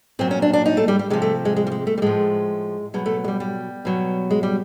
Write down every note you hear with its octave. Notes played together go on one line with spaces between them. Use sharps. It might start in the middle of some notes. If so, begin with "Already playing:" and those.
A#2 F#3 C4
C#4
D4
D4
D#4
A3
G3
G3
C3 F3 G#3
A3
G#3
G#3
G3
G#3
A3
G3
A2 F3 G#3
B2 F#3 G#3
A3
G#3
G3
G3
B2 F#3
G#3
G3